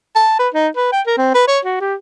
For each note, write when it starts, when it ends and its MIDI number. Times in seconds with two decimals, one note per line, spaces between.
0.15 0.37 81
0.39 0.48 71
0.54 0.68 63
0.76 0.91 71
0.93 1.01 79
1.06 1.17 70
1.18 1.31 60
1.35 1.45 71
1.47 1.60 73
1.65 1.77 66
1.80 1.95 67